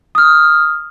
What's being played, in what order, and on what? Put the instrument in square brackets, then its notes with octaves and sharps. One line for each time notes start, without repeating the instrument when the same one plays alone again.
[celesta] D#6 F6